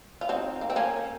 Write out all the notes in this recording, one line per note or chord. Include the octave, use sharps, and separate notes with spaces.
F4
C4 D#4
A#3
C4
A#3 C#4